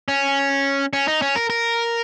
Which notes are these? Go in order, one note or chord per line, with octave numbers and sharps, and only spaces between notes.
C#4
C#4
D#4
C#4
A#4
A#4